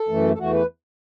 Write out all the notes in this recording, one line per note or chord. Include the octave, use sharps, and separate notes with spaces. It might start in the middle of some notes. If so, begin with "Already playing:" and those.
Already playing: A4
F#2 E3 A3
A4
E2 E3 A3 F#4
B4